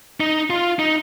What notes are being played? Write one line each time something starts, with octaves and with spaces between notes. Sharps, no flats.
D#4
F4
D#4